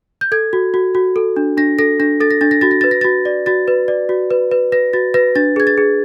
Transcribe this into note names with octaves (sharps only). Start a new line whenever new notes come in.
G6
A4 G#6
F#4
F#4
F#4
A4
D4
D4 A#6
A4 A#6
D4 A#6
A4 A6
A#6
D4 A6
A#6
F#4 A6
A#6
B4 A6
A#6
F#4 A6
D5
F#4 A6
B4
D5
F#4
B4
B4
B4 A#6
F#4 A6
B4 A#6
D4 A6
G#4 G#6
A6
G#4